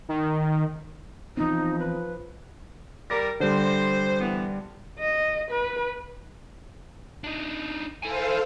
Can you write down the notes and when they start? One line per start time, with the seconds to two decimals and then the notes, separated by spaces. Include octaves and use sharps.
0.09 D#3
1.37 E3 F3 B3 C4 D#4
1.79 B4
3.10 G3 A#4 A#6
3.40 D3 G3 C5
4.20 E3 B3
4.99 D#5
5.51 B4
7.24 D4 D#4
8.03 E4 A4 C5 F5 G#5